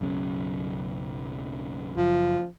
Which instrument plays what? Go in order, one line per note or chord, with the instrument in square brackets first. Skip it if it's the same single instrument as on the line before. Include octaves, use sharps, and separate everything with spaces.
[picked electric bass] B1 F#2 C#3
[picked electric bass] F#1 [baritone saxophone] F3